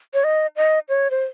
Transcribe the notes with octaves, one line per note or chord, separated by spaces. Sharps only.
C#5
D#5
D#5
C#5
C5